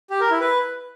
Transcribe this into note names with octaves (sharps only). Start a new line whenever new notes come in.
G4
A#4
E4
B4